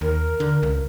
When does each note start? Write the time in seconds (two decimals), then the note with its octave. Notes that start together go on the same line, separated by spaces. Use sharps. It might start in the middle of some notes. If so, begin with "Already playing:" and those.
0.01 D#2 A#4
0.40 D3
0.63 C#2